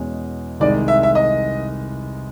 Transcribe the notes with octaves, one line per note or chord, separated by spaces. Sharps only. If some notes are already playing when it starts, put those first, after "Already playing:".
Already playing: E2 B2 G#3 C#4
C2 C3 D#3 G#3 D5
E5
E5
D#5